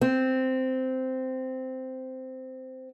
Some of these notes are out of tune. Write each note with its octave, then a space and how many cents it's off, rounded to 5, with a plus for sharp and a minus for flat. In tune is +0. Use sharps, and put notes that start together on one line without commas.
C4 -10